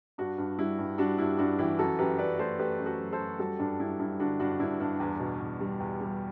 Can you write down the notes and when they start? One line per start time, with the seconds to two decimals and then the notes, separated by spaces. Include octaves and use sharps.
0.18 G2 D4 F#4
0.38 G2
0.58 G3 E4
0.79 G2
0.98 G3 D4 F#4
1.18 G2 E4
1.38 G2 D4 F#4
1.59 E3 E4 G4
1.79 F#2 F#4 A4
1.99 F#2 G4 B4
2.18 F#2 B4 D5
2.39 A3 A4 C5
2.59 A3 G4 B4
2.79 F#2
2.86 F#4 A4
2.99 F#3
3.12 A4 C5
3.19 F#2
3.39 G3 F#4 A4
3.59 G2 D4
3.80 G2 E4
4.00 G2 E4
4.19 D3 D4 F#4
4.40 G2 D4 F#4
4.60 G2 E4
4.80 G2 D4
5.00 E2
5.20 B2
5.40 E2
5.60 G3
5.80 E2
6.01 G3